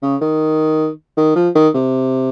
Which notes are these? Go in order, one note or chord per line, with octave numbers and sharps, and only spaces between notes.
C#3
D#3
D#3
F3
D#3
C3